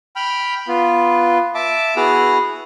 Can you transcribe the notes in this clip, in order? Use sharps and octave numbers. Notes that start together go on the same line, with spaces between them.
G5 B5 F6
B3 F4
E5 A5 D6
B3 E4 F#4 G#4 F#5 F6